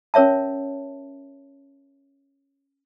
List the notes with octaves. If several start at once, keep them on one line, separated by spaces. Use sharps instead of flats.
C#4 A#4 C#5 E5 A5